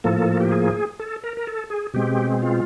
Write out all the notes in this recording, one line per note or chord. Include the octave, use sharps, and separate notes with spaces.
A2 F3 A#3 A4
G4
G#4
A4
A#4
A#4
A4
G#4
B2 G#3 C4 G4
F4